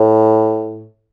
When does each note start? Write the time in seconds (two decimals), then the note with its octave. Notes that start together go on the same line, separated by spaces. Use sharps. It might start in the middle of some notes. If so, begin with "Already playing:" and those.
Already playing: A2